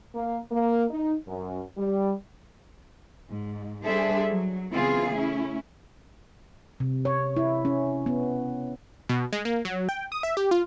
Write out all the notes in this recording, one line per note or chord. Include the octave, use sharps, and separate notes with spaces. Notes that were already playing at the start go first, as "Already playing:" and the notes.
A#3
A#3
D#4
F#2
G3
G#2
G3 D4 G#4 A4 C5 E5
F#3
C#3 E3 B3 C4 F4 G#4
A3 C#4 E4
C3
C#5
E4
C#4
B3
B2
G#3
A#3
F#3
G5
D#6
E5
G4
F4